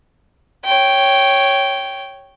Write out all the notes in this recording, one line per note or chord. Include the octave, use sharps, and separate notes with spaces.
C#5 G5